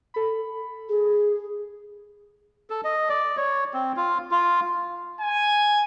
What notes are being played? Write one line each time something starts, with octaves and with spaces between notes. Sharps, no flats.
A4 B5
G#4
A4
D#5
D5
C#5
C4
F4
F4
G#5